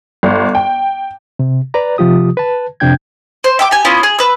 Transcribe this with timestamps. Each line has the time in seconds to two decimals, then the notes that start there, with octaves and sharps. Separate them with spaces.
0.23 G1
0.55 G5
1.39 C3
1.74 B4 D5 A#5
1.98 C3 F3 F4 G4 D#6
2.37 B4 A5
2.80 F2 C3 D4 G5 G6 G#6
3.44 C5
3.59 E5 G5 D6
3.71 G4 G#5
3.85 B3 C#4 E4 F4
4.03 G#4
4.19 B4 E6